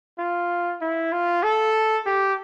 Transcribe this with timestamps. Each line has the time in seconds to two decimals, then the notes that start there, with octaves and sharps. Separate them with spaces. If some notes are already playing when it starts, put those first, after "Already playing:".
0.19 F4
0.81 E4
1.12 F4
1.43 A4
2.06 G4